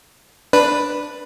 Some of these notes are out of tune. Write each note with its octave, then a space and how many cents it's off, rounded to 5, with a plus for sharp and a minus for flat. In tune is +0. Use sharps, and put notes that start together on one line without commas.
D4 +5 B4 +0